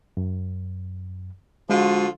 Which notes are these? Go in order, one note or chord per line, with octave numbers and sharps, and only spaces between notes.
F#2
D3 F3 G#3 F4 F#4